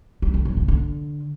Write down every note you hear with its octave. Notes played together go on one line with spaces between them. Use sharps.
G3
D3
F#2
C#3
D3